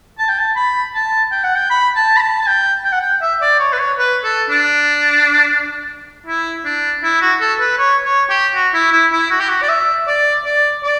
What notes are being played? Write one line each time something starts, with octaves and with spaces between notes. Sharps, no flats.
A5
G5
A5
B5
A5
G5
F#5
G5
B5
A5
B5
A5
A5
G5
G5
F#5
G5
E5
D5
C#5
B4
C#5
B4
A4
D4
E4
D4
E4
F#4
A4
B4
C#5
C#5
G4
F#4
E4
E4
E4
F#4
G4
F#4
D5
E5
D5
D5
D5